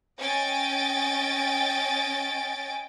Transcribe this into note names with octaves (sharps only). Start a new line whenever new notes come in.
C#4 D#5 G5 G#5 A6 D7